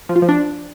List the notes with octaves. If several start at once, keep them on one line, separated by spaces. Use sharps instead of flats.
F3
F4
F3
D4